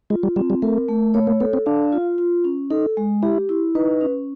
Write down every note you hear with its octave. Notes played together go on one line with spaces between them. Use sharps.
G#3 F4
G3
G3 C4
G3
A3 A#4
A3
A#3 C#5
A#3
B3 A4
C4
D4 F5
F4
F4
C#4
D#4 A4
G#3
E4 G4
E4
D#4 B4
C#4